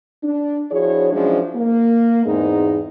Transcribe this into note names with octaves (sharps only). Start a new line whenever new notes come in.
D4
F3 D4 E4 F#4 G#4 C#5
F3 F#3 G#3 C#4 D4 E4
A#3
E2 G#2 G#3 C4 D#4 E4